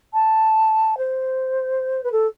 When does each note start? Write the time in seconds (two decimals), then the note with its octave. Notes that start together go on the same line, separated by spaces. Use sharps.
0.14 A5
0.98 C5
2.04 B4
2.12 A4